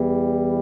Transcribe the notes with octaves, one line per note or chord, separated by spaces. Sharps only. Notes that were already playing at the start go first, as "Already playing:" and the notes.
Already playing: E2 E3 G3